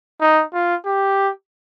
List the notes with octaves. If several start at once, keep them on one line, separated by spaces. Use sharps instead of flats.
D#4
F4
G4